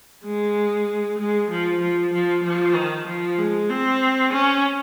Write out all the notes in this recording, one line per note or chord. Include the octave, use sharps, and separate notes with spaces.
G#3
G#3
F3
F3
F3
F3
D#3
F3
G#3
C4
C#4